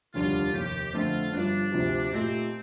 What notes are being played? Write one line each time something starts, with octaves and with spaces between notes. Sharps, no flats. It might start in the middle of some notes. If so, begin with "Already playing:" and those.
F1 D#2 D3 G3 D4 F4
F1 D#2 D#3 G4
F2 D3 A3 C4 F4
G1 G2 F3 D4
D2 C3 F3
A#2 A3 C4 D#4 G4